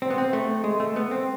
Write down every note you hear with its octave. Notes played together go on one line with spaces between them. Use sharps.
C4
B3
C4
A3
G#3
A3
B3
C4